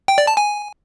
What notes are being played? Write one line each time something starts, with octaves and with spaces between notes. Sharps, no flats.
G5
D5
A5
G#5